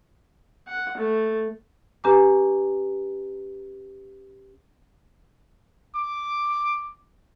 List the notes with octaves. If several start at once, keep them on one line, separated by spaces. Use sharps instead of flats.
F#5
A3
C#4 G4 B4 G#5 A#5 D6
D6